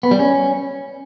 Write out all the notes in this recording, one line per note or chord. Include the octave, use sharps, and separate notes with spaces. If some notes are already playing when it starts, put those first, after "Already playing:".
B3
G3
C#4